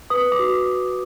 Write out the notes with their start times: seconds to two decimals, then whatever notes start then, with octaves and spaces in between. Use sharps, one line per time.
0.10 B4 D#6
0.32 D6
0.39 F#4